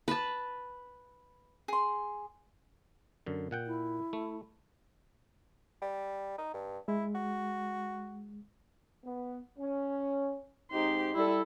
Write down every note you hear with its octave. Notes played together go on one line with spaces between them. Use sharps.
B4 A5
G#4 C6
F#2 D3
A#2 F#5 G5
E4
A3
G3
D#4
G2
G#3 E4
F#4
B3
C#4
G#2 C4 D#4 G4 C6
G3 E4 A4